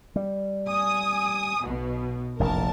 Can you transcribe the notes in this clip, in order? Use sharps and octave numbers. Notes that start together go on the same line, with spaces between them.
G3
G#5 D#6
B1 B2
F1 A#1 E2 A#4 A5